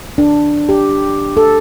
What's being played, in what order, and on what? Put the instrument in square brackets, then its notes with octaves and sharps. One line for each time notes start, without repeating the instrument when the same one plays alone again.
[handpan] D4
G4
A4